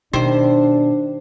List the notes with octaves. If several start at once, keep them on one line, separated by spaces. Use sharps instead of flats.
B2 D#3 G3 D4 C5 E5